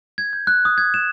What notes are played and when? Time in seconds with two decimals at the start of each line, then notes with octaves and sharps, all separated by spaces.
0.18 G#6
0.33 G6
0.47 F#6
0.65 D#6
0.78 G#6
0.94 E7